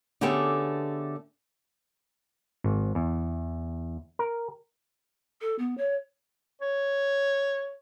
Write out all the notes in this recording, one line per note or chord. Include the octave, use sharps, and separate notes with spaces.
D3 A3 B3 C#4 G4 G#4
G#1
E2
A#4
A4
B3
C#5
C#5